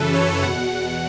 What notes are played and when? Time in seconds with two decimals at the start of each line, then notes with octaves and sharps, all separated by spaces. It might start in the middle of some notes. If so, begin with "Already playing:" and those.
Already playing: F#2 C#3 E3 A4 B4
0.14 C#5
0.42 E2 B2 F#5